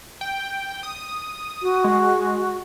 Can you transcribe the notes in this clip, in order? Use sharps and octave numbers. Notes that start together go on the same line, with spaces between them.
G5
D#6
F#4
G#3